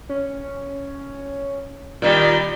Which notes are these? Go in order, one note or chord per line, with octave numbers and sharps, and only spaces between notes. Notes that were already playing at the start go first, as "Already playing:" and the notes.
C#4
A#2 D#3 G3 F4